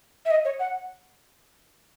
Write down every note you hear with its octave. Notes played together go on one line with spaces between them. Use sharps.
E5
D#5
C#5
F#5